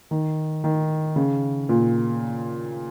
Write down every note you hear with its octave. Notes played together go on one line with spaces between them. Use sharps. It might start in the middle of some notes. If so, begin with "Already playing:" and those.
D#3
D#3
C#3
A#2